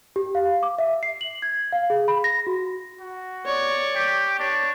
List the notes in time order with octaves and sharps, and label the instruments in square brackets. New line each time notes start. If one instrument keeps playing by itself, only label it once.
[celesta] G4
F5
D6
E5
C7
F#7
G#6
F5
G#4
B5
A#6
F#4
[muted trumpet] F#4
[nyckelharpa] C#5 D5
[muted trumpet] G4
[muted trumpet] D4 [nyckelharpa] C#5